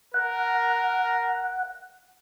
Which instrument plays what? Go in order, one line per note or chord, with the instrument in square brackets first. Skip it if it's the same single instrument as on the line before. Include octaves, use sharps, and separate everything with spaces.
[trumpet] A#4 [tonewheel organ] F#5